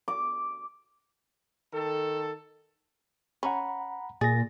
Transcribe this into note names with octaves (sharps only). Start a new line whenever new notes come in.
D6
D#3 A4
C#4 F#5 A#5 B5
A#2 G#4 A6 A#6